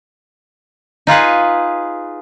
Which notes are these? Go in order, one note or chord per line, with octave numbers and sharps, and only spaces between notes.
D#4 F4 G#4 B4